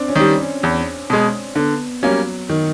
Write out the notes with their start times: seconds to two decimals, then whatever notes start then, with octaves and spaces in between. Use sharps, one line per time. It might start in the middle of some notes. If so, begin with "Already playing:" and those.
Already playing: C4 D4
0.09 C#4
0.16 D#3 G3 D4
0.40 C#4
0.63 E2
1.10 B2 G#3
1.55 D3 B3
2.03 F#3 G3 A#3 C#4
2.49 D#3